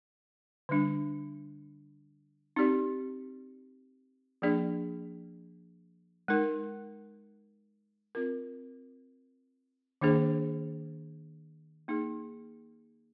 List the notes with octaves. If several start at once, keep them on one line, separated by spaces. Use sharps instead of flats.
D3 G3 D4
C4 D#4 G4 D5
F3 A#3 D4 G#4 D5
G#3 D#4 A#4
C4 F4 A#4
D#3 A#3 D4 G#4 C5
A#3 D#4 G#4